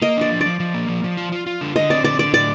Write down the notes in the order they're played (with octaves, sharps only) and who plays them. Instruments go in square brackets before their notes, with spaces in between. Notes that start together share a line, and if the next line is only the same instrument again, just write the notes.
[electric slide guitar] A#3 [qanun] D#5
[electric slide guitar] D4 [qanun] D5
[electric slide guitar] F3
[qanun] D5
[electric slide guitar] F3
F3
A#3
F3
F3
F4
F4
F4
D3
[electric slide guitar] D3 [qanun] D#5
[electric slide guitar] C4 [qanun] D5
[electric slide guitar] D3 [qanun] D5
[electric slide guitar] D3 [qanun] D5
[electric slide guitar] A2 [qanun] D5